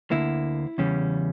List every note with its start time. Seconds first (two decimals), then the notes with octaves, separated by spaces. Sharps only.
0.11 D2 D3 A#3 E4
0.78 E2 C#3 G3 C#4